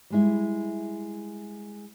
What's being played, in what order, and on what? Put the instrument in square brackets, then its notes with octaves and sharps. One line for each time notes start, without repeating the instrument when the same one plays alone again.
[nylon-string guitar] G3 G#3 E4